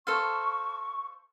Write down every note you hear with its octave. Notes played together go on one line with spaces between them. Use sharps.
A4 C5 F5 C#6